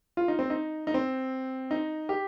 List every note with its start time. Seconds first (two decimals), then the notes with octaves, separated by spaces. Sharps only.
0.17 F4
0.28 D#4
0.39 C4
0.50 D#4
0.87 D#4
0.94 C4
1.71 D#4
2.09 G4